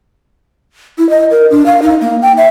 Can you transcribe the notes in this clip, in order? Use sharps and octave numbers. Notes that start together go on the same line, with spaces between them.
E4
D#5
A#4
D4
F5
D#4
A#3
G5
E5